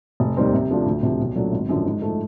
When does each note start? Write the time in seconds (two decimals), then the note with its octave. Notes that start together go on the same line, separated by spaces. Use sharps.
0.20 F1
0.37 D#2 D#3 G3 C4
0.53 C3
0.70 F3 A3 D4 F4
0.86 D2
1.03 C3 F3
1.20 B1
1.36 A#2 F#3 A3 D4
1.52 G#1
1.69 F#2 D3 F3
1.86 G#2
2.02 F3 A3